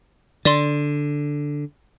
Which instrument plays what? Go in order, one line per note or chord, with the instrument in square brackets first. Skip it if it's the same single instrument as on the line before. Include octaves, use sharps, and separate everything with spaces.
[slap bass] D3 [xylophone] D5 C6